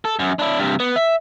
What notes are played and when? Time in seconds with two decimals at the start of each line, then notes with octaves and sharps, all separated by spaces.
0.05 A4
0.19 F#2
0.39 D4 E4
0.59 G2 C3
0.80 B3
0.96 E5